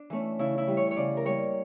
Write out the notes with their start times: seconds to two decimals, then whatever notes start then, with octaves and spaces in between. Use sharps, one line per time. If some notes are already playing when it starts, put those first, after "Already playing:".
Already playing: D4
0.10 E3 A3 C#4
0.39 C#3 E4
0.58 E4
0.67 E3 G3
0.77 C#5
0.91 C#5
0.97 C#3 D5
1.17 A#4
1.25 G3 A#3 C#5